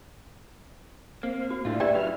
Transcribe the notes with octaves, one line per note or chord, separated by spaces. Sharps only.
A#3 C4 F5
F#4
A2 G3 A3 D4 E4 F4
G4 B4 D5 E5 G5 G#5
C#3 F#3 B4 F6